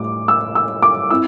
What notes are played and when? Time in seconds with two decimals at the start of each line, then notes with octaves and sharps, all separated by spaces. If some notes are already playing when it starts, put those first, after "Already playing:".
Already playing: A2 G3 D6
0.28 E6
0.55 E6
0.82 D6
1.10 C4 E4 E6